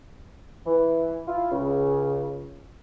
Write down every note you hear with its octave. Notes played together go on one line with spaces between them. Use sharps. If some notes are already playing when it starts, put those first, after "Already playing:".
E3
E4 F4
C#2 C#3